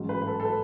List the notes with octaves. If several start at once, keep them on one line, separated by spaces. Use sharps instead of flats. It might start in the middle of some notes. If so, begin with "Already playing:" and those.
Already playing: A1 G#2 F#3
B4
B4
A4
A4
B4